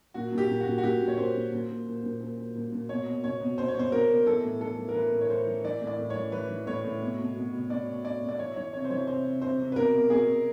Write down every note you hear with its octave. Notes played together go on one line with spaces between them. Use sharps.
A#2 F#4
A#2
G4
A#2
F#4
A#2
F#4
A#2 G4
A#2
C#5
A#2 C5
A#2
A#2
A#2
A#2
A#2
A#2
A#2
A#2
A#2
B2 C#5
B2
B2 C#5
B2
B2 C5
C#5
B2 C5
B2 A#4
B2
E3 A4
A2
E3 A4
E3
A#4
E3 B4
A2
C#5
A2 C5
E3
E3 D5
A2
D5
A2
C#5
E3
E3 B4
E3
A2 C#5
A2
B2
B2
B2
B2
B2 D5
B2
B2 D5
B2
D5
E3 C#5
E3 C#5
C3 C#5
C5
E3 C#5
C3 C5
C3
C3 C5
C3
B4
B2 A#4
B2
B2 G#4
B2